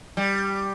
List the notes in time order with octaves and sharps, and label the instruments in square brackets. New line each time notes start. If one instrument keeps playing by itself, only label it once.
[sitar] G3